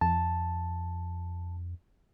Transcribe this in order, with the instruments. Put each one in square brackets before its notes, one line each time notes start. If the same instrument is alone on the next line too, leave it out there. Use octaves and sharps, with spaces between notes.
[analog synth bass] F2 [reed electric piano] A5